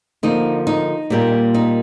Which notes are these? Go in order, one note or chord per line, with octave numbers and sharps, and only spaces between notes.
D3 F3 A#3 D#4
D#4
A#2 G3 A#3
D#4